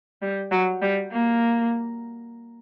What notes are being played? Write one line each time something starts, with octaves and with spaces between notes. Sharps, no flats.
G3
F#3
G3
A#3